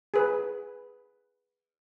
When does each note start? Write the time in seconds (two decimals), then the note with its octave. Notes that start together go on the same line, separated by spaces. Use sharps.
0.14 G#4 B4